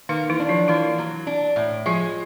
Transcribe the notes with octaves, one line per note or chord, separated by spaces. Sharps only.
D#3 A#3 D#4
E3 E4
D4
F3 F4
E3 A#3 E4
F#3
D4
A2
F3 G#3 F4